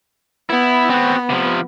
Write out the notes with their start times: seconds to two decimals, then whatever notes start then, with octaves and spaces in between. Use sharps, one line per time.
0.50 B3 E4
0.90 C4 F#4
1.30 C3 F3